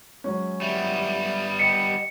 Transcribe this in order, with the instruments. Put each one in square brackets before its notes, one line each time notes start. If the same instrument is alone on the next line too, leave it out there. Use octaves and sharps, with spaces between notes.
[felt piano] F#3 G#3 C#4
[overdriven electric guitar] G3 B3 [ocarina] E5
[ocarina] D#5 [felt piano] G5 B6 [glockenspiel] C#7